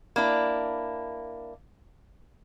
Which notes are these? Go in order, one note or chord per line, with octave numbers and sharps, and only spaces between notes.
A#3 D4 E4